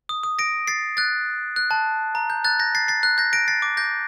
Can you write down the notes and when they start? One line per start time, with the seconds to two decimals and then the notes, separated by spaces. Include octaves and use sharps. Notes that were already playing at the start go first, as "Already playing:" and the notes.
0.09 D#6
0.24 D#6
0.39 A#6 D7
0.67 A6 C7
0.97 F#6 A6
1.56 F#6
1.71 A5
2.15 A#5
2.30 G6
2.44 F#6 A6
2.59 G6 A#6
2.75 A6 C7
2.88 A6 C7
3.03 F#6 A6
3.18 G6 A#6
3.33 A#6 D7
3.48 A6 C7
3.62 D6
3.77 G6 A#6